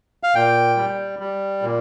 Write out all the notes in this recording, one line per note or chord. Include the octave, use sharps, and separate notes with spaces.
F5
A#2 G5
G3
G3
A#2